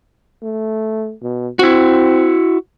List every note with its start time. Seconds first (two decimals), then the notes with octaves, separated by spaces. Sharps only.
0.42 A3
1.22 B2
1.59 C4 E4 F#4